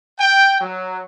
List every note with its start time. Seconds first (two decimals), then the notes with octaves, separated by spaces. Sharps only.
0.19 G5
0.61 F#3